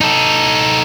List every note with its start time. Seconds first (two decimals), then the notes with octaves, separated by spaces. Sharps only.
0.01 D#4 A4